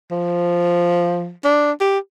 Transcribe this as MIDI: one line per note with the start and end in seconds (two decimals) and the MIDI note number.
0.11 1.31 53
1.45 1.72 62
1.81 1.99 67